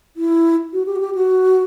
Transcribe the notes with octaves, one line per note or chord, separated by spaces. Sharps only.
E4
F#4
G4
F#4
G4
F#4